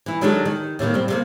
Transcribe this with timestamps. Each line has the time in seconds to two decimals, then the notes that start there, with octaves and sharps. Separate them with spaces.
0.06 E3 E4
0.21 D#3 F#3 G#3 D4 G4 A4
0.45 D#3
0.79 A2 C3 D#3 A#3
0.94 G3 C4
1.08 C3 A3 A#3